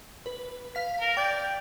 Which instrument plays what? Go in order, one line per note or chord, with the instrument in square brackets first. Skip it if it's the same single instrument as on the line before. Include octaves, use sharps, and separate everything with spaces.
[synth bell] B4
F5 B6
[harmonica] A#4
[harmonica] D5 [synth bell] G5 G6